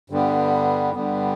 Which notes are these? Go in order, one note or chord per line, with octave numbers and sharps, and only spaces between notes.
G2 D3 G3 B3
G2 D3 G3 B3